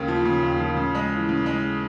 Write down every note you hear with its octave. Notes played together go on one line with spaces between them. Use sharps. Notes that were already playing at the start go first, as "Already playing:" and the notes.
Already playing: D#2 C#3 A#3
F3
C#3
D#2
F3
C#3
G#3
E3
C#3
G#3